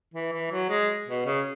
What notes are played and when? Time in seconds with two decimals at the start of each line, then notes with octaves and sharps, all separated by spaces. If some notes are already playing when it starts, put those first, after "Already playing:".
0.14 E3
0.32 E3
0.51 F#3
0.69 G#3
1.07 B2
1.26 C#3